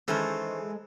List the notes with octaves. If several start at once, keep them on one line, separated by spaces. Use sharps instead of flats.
D#3 E3 G#3 C#4 A4 C5